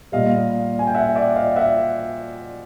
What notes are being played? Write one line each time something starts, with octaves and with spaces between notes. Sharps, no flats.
A#2 G3 D#5 F5
G#5
G5
E5 F#5
D5 E5
D#5 F5
E5 F#5